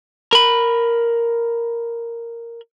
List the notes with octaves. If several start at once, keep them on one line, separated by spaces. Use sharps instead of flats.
A#4 B5